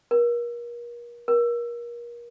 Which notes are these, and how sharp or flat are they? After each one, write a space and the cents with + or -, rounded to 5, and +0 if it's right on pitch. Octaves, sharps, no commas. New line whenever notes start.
A#4 +35
A#4 +30